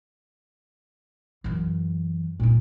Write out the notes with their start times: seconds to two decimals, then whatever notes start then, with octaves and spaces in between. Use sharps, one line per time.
1.44 F#2 E3
2.40 C2 A#2 D#4